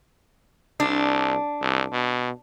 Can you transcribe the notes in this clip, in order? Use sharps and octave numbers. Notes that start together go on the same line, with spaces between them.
C2 D4
C2
B2